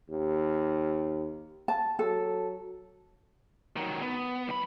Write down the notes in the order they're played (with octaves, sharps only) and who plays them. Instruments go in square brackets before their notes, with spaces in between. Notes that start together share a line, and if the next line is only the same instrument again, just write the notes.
[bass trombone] D#2
[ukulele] A5
[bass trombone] F#3 [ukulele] A4
[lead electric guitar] D#3 F#3
B3
B1 B5